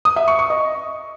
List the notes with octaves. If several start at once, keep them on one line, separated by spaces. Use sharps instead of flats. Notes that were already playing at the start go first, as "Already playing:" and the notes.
D#6
E5
C#6
C#6
D#5